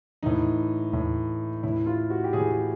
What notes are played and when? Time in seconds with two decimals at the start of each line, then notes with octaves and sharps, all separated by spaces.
0.23 A2 E3 D#4
0.93 A2 E3
1.63 A2 E3 E4
1.86 F4
2.10 F#4
2.24 G4
2.33 A2 E3 G#4
2.51 G#4